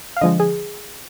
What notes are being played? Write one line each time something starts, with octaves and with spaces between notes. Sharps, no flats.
F5
D3 F3 G#3 D#5
G#4